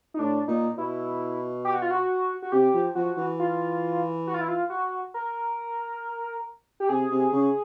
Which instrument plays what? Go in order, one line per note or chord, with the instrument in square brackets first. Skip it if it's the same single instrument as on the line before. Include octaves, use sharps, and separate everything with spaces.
[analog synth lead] D#4
[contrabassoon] A2 [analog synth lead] D4
[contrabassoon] A#2 [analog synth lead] D#4
[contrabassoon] B2 [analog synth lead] E4
[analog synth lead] G4
F#4
F4
F#4
F#4
[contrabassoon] C3 [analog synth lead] G4
[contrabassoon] F3
[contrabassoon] F3 [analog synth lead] F#4
[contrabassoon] E3
[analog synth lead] F4
F#4
F4
E4
F4
F#4
A#4
G4
[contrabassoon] C3 [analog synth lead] G#4
[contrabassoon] C3
C#3